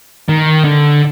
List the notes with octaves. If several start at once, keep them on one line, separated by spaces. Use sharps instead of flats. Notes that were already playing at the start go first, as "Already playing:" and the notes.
D#3
D3